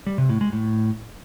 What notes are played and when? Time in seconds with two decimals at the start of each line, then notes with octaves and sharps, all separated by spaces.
0.07 G3
0.18 C3
0.29 A2
0.41 G#3
0.52 A2